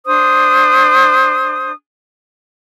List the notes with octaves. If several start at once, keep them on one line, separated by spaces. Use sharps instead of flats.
D4 C5 D#6